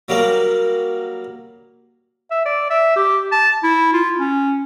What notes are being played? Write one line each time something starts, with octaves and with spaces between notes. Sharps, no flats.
F#3 G3 A#3
E5
D5
E5
G4
A5
E4
F4
C#4